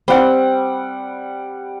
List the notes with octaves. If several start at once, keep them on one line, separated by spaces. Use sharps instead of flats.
G3 C4 F#5